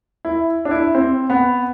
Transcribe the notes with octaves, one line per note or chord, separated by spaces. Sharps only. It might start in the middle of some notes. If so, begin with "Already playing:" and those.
E4
D4
E4
C4
B3